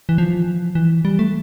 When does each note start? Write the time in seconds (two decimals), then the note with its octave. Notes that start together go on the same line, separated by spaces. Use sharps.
0.09 E3
0.18 F3
0.75 E3
1.05 G3
1.19 A3